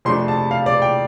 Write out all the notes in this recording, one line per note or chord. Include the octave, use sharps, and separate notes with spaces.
F2 C3 A3 D4 C6
A5
F5
D5
G5